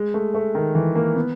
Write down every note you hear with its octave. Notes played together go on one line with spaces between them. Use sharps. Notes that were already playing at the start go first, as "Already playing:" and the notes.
Already playing: G#3
A3
A3
D#3
E3
A#3
B3